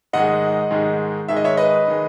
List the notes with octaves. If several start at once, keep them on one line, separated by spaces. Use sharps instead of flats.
G#2 D#3 G#3 D#5 F#5
G#2 D#3 G#3
G#2 D#3 G#3 E5
D#5
C#5 E5
B4 D#5
D#3 G#3